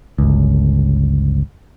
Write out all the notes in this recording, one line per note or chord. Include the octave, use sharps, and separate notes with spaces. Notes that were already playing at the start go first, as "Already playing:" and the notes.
G1 C#2